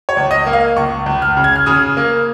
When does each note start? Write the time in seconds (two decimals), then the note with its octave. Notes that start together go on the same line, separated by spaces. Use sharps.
0.09 C#5
0.17 C#2
0.31 D#5
0.46 A#3
0.53 F5
0.76 C#2 C#6
1.06 C#2
1.22 F6
1.37 C#3
1.44 G#6
1.56 F6
1.66 C#3 D#6
1.97 A#3